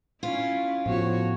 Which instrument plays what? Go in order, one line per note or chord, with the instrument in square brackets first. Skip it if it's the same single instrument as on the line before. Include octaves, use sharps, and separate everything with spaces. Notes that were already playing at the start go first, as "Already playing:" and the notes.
[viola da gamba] C#4 E4 [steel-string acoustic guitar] F4
[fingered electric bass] A2 B3 [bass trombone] F3 [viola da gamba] F#4 C#5